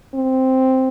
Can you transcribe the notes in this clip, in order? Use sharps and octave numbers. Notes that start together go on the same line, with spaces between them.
C4